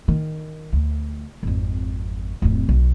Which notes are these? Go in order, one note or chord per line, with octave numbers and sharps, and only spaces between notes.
D#3
D2
G#1 F2
D1 F2
B1